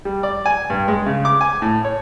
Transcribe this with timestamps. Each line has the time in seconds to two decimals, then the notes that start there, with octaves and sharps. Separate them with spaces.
0.05 G3
0.23 D5
0.46 G#5
0.70 G2
0.88 G#3
1.06 C#3
1.25 D6
1.41 G#5
1.62 A2
1.85 C#5